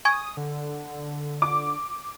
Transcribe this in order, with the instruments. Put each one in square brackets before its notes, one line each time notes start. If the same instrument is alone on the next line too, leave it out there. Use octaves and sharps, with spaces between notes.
[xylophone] G#5 C#6 G#6 [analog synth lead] D#6
[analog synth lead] D3
[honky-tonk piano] D6